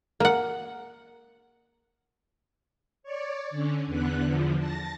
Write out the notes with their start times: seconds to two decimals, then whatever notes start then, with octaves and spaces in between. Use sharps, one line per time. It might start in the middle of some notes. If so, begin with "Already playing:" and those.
0.20 A#3 F#5
3.03 C#5 D5
3.50 D3 C#4
3.87 E2 D3 B3 F#6
4.21 E2 D3 F3
4.58 A5 A6 A#6